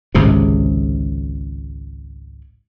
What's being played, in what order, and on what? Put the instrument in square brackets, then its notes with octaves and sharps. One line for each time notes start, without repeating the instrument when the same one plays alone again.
[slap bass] G#1 C#2 G#2 C3